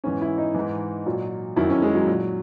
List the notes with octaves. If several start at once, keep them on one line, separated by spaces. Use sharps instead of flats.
G#2 E3 C#4
E4
D#4
G#2 E3
A#2 F#3
F#2 D#3 F#3 E4
C#4
G#3
F#3
A#2 F#3